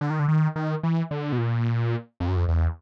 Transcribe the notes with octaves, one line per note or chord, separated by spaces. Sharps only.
D3
D#3
D3
D#3
D#3
E3
D3
B2
A#2
F2
F#2
F2
E2